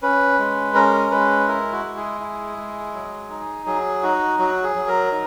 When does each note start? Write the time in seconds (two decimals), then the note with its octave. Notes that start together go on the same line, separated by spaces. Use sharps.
0.02 C#4 B4
0.39 G#3
0.75 C#4 A#4
1.11 G#3 B4
1.47 E4 A#4
1.72 F#4
1.85 G#3
1.96 G#4
2.21 E4
2.57 G#3
2.94 F#3
3.30 D#4
3.66 F#3 G#4
4.03 D#4 F#4
4.39 F#3 F#4
4.63 G#4
4.76 F#3
4.88 A#4
5.12 D#4